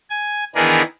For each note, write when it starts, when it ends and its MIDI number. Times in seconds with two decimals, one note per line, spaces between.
0.10 0.44 80
0.55 0.82 51
0.55 0.82 52
0.55 0.82 59
0.55 0.82 62
0.55 0.82 68
0.55 0.82 70